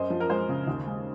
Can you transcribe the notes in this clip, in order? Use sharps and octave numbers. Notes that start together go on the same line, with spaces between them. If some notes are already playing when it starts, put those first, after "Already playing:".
Already playing: F#2 C5 D#5
F3
A#4
G#3 C5
C#3
D#2
G#3